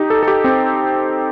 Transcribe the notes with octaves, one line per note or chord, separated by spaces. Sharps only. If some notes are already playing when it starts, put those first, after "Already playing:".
Already playing: D#4 G4
A4
A4
G4
C4